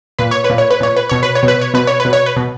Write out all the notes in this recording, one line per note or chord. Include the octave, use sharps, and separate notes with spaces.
A#2 B4
C#5
B4
A#2
C#5
B4
A#2 C#5
B4
B2 C#5
B4
C#5
B2
B4
C#5
B2 B4
C#5
B4
B2
C#5
B4
B2